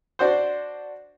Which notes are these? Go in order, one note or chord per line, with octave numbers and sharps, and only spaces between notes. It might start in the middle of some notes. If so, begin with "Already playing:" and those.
D4 F#4 C5